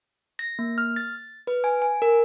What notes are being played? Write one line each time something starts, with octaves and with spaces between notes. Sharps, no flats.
A#6
A#3
F6
A6
B4
G#5
G#5
A#4